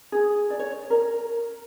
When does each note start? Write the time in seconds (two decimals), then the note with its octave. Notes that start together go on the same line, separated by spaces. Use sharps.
0.12 G#4
0.50 D5
0.59 C#5
0.90 A#4